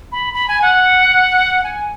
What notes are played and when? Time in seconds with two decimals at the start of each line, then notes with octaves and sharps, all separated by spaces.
0.12 B5
0.34 B5
0.48 G#5
0.62 F#5
1.64 G#5